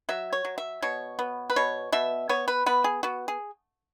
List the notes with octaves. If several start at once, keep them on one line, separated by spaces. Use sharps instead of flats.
F#3 E5
C#5
F#3
E5
B2 C#5
B3
B4
B2 C#5
B2 E5
B3 C#5
B4
B3 B4
G#4
B3 F#4
G#4